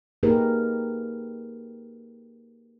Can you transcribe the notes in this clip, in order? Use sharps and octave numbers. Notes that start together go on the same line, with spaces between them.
A#3 D#4 G4 G#4 A#4 B4